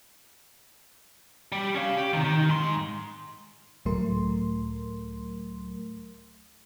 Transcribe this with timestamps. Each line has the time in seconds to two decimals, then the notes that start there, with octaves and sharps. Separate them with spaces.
1.52 G3 G4
1.75 C#4 F5
1.97 G4
2.13 C3 D#3
2.24 D#3
2.49 G#2 C6
3.85 C#2 A2 F#3 A3 A#4 C6